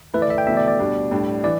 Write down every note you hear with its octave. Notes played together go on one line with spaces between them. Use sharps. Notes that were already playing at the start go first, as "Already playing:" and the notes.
E3 A3 E4 B4
D5
E5
G5
B2 A3 E4 E5
D5
D5
B2 G3 D4
A2 G3 D4
E3 D5